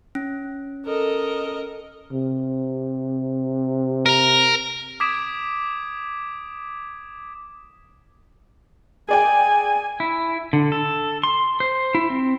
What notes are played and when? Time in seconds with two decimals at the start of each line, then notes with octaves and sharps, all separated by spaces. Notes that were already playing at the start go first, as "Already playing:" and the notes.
0.15 C#4
0.86 A4 A#4 D#5
2.13 C3
4.06 A#4 A#5
5.00 D6 D#6 G#6 B6 D7 E7
9.09 G#4 D5 G5 G#5
10.00 E4
10.53 D3
10.72 A4
11.23 C6
11.60 C5
11.95 E4
12.10 C4